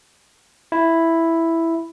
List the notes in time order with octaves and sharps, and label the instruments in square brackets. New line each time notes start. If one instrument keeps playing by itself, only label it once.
[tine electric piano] E4